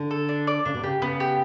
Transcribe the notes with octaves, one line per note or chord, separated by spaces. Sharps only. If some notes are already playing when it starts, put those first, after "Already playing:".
Already playing: D3
A4
D4
D5
C#3 D4
B2
C#3 G4
C#3 B3
G4